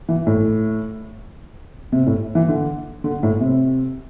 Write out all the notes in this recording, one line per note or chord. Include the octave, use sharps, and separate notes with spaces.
E3
A2
C3
A2
E3
D3
D3
A2
C3